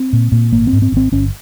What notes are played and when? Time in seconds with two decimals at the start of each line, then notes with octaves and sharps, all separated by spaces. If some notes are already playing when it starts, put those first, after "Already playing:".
Already playing: C4
0.13 A#2
0.32 A#2
0.52 G#1 A#3
0.67 C4
0.73 G#2
0.82 C4
0.92 G#1 C4
1.12 G1 C#4